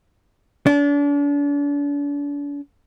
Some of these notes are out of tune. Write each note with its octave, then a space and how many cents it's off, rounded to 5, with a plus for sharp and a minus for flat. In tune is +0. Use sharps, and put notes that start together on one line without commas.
D4 -40